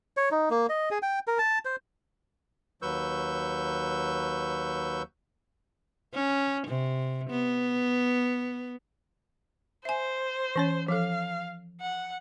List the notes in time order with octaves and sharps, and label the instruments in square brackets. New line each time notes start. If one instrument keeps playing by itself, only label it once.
[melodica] C#5
D#4
A#3
D#5
G#4
G5
A#4
A5
C5
[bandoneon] D#2 F#3 B4 C#6 E6 G6
[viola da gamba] C#4
C3
B3
[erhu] C5 [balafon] E5 G#5
[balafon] E3 C#4 C#5
[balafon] F3 A4 [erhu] F5
[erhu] F#5